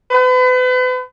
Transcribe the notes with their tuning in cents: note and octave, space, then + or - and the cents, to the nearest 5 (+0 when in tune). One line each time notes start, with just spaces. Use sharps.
B4 +40